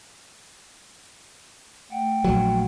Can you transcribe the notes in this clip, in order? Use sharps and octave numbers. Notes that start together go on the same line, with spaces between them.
A3 F#5 G5
A#1 F#3